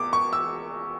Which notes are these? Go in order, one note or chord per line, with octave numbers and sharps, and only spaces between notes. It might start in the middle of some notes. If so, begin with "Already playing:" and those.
Already playing: E2 D6
C#6
E6